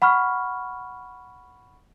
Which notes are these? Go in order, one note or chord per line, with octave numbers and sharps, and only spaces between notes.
F#5 B5 C#6 F6